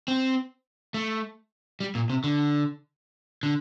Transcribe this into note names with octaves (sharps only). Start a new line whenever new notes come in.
C4
A3
G3
A#2
C3
D3
D3